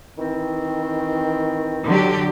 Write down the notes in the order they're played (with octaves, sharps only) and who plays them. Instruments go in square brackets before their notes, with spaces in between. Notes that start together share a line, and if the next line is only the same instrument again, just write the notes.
[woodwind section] D#3 E3 C4
[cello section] D3 F#3 G4